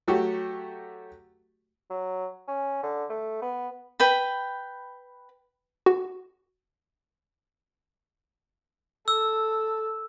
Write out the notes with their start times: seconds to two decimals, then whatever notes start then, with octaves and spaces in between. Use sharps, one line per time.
0.08 F#3 A3 F#4 G4
1.90 F#3
2.48 C#4
2.83 D3
3.10 A3
3.42 B3
4.00 B4 G5 B5
5.86 F#4
9.08 A4 E6